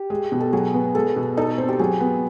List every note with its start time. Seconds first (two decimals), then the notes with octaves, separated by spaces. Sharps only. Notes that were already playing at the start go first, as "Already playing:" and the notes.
Already playing: G4
0.10 G#3
0.32 B2
0.40 A4
0.53 F#3 G#4
0.74 B3
0.95 G#3 A4
1.16 B2
1.37 D#4 A4
1.58 C4
1.68 G4
1.79 F#3 G#4
2.00 B3